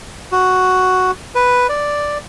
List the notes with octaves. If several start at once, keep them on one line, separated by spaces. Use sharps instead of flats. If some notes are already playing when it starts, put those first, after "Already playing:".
F#4
B4
D5